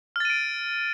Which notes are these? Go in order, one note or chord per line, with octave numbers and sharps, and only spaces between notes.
F6 A6 D7 D#7